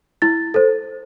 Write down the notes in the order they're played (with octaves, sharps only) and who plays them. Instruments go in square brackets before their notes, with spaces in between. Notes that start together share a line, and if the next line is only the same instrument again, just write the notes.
[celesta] E4 A6
A4 C5